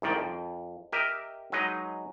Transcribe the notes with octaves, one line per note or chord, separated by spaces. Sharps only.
C2 G#2 D#3 D5 G5
F2
G4 A#4 D#5 E5
F#3 G#3 D#4 B4 D#5